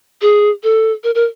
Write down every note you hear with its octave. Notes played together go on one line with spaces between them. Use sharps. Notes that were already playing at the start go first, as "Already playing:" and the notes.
G#4
A4
A#4
A#4